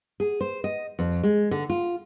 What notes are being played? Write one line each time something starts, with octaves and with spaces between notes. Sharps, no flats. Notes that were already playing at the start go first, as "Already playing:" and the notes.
G#4
C5
D#5
F2
G#3
D3
F4